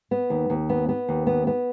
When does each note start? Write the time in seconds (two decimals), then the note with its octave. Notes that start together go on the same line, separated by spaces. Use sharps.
0.11 B3
0.30 D#2
0.50 D#2
0.69 B3
0.89 B3
1.09 D#2
1.27 B3
1.47 B3